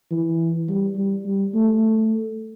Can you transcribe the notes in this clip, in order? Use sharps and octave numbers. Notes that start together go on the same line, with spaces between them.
E3
G3
G3
G3
A3